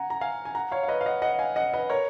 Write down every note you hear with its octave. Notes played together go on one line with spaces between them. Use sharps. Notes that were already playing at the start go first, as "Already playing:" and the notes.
Already playing: F#5 G#5 A#5
A#5
F5 G#5
G#5
F#5 A#5
C#5 F5
F5
B4 D#5
F5
D#5 F#5
D#5 F#5
F5 G#5
D#5 F#5
B4 D#5
A#4 C#5